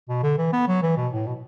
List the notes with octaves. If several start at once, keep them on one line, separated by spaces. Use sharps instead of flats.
B2
D3
E3
B3
F#3
E3
B2
A2
B2